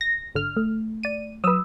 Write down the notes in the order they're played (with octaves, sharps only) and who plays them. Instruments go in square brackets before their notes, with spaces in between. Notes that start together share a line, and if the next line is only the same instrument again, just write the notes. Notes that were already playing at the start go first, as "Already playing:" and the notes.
[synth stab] A#6
G#1 D3 F6
[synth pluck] A3
[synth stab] D5 D#7
[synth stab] F#3 B4 [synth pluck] D#6 E6